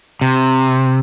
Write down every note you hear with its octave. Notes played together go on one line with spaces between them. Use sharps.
C3